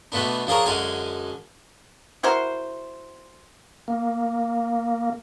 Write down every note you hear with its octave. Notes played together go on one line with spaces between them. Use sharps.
B2 D3 A3 B3 D4
F3 D4 G#4 A#4 C#5
F#2 D3 G#3 F5 G#5
E4 F#4 A#4 C5
A#3